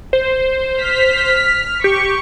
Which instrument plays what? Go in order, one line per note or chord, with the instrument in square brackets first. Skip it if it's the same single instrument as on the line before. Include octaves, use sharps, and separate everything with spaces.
[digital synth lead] C5
[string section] F6 B6
[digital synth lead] G4 [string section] C#6